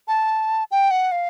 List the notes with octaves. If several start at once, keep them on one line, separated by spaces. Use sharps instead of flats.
A5
G5
F#5
F5